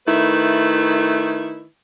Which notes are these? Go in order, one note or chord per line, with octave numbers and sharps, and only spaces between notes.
D#3 A3 E4 B4